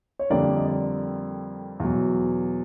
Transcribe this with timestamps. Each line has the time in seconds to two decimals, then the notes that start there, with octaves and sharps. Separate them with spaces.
0.19 C#5
0.30 F2 D3 G3 A#3 D5
0.57 D#5
0.68 D5
1.80 E2 B2 F#3